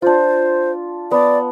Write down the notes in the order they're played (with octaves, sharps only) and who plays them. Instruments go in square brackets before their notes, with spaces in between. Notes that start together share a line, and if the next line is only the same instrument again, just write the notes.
[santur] D4 F4 [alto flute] C5
[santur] B3 A5 [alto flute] D5